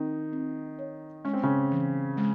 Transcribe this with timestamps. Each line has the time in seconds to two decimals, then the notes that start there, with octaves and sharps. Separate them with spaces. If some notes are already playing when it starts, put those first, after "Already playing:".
Already playing: D#3 C4 D#4
0.33 C4
0.79 C#5
1.25 G#3 C#4
1.33 C4
1.43 C#3 C#4
1.71 E3
2.17 G#3